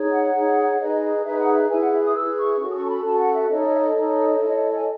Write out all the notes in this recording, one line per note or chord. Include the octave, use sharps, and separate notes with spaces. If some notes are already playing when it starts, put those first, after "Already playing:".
Already playing: D#4 G#4 C#5
F#5
D#4 G#4 C#5
D#4 G#4 B4 D#5
D#4 G#4 B4 E5
F#5
E5
E4 G#4 B4 G#5
F#5
E5
D#6
E4 G#4 B4 E6
C#6
C#4 F#4 A4
D#6
C#6
A5
B5
C#4 F#4 A4 A5
F#5
E5
D#4 A4 C#5 D#5
E5
D#5
E5
D#5
D#4 A4 C#5
E4 A4 C#5
G#5